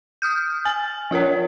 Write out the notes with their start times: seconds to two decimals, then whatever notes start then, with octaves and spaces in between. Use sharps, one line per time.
0.22 D#6 F6 G6
0.65 G#5 A6
1.11 F3 F4 A#4 C#5